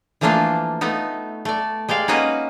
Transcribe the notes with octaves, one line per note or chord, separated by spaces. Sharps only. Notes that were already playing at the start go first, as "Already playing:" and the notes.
E3 F3 A3 A#3 D4 F4
A3 B3 D#4
A3 D5
G#3 G4 D5 F5
A#3 C#4 D#4 F#4 B4 D#5